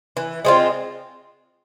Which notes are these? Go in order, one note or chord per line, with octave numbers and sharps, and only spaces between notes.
E3
G#3 C4 F4